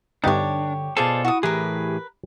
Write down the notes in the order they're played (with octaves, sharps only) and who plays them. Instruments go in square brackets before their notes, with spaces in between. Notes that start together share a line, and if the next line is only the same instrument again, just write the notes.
[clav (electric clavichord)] G2 B3 D#4 [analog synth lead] D3 [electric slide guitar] D4 [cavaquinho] G4 C#5
[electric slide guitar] B2 F4 A4 [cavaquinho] G#4 D5 A5 [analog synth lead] C5
[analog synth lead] E4 [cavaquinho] F#4 D#6
[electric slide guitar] A2 E3 G#4 [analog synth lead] G4 [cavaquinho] A#4 B4